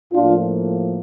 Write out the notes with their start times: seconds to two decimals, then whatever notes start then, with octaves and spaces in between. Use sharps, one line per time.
0.13 A2 F3 A#3 D4 F4